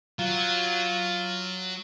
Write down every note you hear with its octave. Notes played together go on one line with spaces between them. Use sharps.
F#3 F4